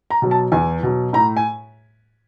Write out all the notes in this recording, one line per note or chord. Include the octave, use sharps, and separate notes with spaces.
A#5
B2 F#3
A5
E2 G#5
B2 F#3
A2 A#5
G#5